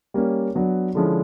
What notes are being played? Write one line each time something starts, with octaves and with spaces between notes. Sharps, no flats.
G3 A#3 C#4
F#3 B3 D4 F#4
D3 F3 G#3 C#4 E4